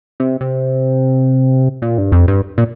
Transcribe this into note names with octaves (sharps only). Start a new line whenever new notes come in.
C3
C3
A#2
G2
F2
G2
A#2